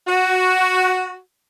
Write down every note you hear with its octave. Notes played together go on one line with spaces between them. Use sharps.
F#4